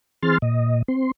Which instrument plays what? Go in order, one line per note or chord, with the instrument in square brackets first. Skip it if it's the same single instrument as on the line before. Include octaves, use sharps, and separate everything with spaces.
[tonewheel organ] E3 C4 G#4 C6 F6 A6
A#2 D#5
C4 C6